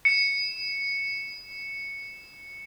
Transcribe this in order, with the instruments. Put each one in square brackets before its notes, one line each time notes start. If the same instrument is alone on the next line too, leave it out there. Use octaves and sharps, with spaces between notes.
[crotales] C#7 E7